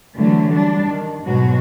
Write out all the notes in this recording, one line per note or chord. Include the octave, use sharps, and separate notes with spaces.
D3 E3 F#3 G3 A3
G3 D4
D#3
G#2 B2 F#3 G#3 F#4